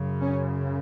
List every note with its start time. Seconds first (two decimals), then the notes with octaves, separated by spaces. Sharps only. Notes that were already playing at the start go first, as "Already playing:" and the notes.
Already playing: F#2 C#3
0.21 C#4